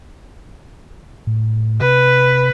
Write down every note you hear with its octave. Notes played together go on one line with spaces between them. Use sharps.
A2
C3 B4